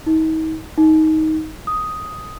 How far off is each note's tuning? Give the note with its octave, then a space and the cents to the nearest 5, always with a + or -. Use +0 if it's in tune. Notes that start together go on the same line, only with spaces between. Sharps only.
D#4 +40
D#4 +15
D#6 +5